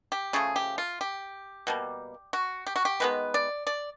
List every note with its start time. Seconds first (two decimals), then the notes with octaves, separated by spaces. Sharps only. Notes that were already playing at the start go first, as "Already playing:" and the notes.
0.12 G4
0.33 C#3 F3 A3 G#4
0.56 G4
0.78 F4
1.01 G4
1.67 B2 G3 A#3
2.33 F#4
2.66 G4
2.76 F#4
2.85 G4
3.00 D#3 G#3 B3 B4
3.34 D5
3.67 D5